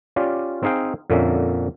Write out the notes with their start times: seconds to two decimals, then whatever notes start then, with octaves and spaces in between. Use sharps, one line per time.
0.16 C#4 F4 G4 D5
0.63 C4 D#4 G#4 F5 G5
1.10 F2 A#2 D3 A#3 C#4 E5